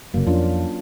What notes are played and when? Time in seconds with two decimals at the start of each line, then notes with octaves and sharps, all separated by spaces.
0.14 F#1 C#3 F#3 A#3
0.27 F2 C#4 D4 F4